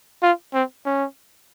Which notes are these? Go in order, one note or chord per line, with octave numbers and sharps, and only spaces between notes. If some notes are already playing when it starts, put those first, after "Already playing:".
F4
C4
C#4